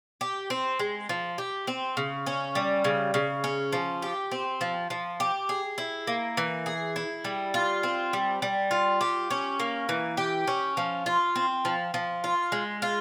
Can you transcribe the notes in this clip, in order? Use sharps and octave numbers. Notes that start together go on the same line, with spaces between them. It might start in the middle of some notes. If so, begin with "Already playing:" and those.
G4
C4
G#3
F3
G4
C4
C#3
C#4
G3
C#3
C#3
C#4
F3
G4
C4
F3
F3
G4
G#4
E4
A#3
E3
G#4
E4
G3
F4
C4
G3
G3
F4
G4
C#4
A#3
E3
G4
C#4
F3
F4
C4
F3
F3
F4
G#3
F4